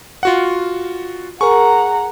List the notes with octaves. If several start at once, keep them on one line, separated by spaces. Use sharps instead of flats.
F4 F#4 F#5
G#4 A#4 F#5 A#5 C#6